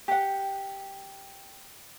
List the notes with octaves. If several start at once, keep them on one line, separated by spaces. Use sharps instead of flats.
G4 F#5